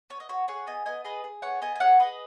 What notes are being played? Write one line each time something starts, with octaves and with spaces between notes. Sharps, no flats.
B3 C#5
D#5
F#4 C#5
G#4 C#5 F#5
B3 D#5 G#5
B3 D#5 G#5
G#4 B4 D#5
G#4
B3 C#5 F#5
B3 D#5 G#5
G#5
G#4 C#5 F#5
G#4 B4 D#5